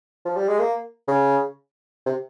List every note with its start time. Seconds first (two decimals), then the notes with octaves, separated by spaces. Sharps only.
0.25 F3
0.37 G3
0.48 G#3
0.59 A#3
1.08 C#3
2.06 C3